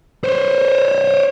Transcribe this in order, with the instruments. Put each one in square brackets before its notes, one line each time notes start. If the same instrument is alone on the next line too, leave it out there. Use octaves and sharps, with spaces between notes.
[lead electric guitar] C5 C#5